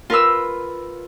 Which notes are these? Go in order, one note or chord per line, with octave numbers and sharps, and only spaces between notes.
F4 A#4 B4 E6